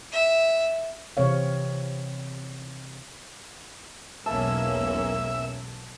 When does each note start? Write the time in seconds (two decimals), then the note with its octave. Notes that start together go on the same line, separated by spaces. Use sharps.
0.12 E5
1.17 C3 E3 C4 C#5 F5
4.26 B1 E2 G#3 A#3 C#4 E5 A5